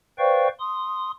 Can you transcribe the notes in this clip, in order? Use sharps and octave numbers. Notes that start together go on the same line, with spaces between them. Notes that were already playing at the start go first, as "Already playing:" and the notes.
B4 C5 D5 F5 G5 C#6
C6 D#6